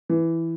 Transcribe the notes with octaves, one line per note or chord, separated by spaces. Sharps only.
E3